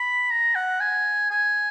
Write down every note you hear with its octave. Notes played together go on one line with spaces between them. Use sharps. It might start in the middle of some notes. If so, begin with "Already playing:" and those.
Already playing: B5
A#5
F#5
G#5
G#5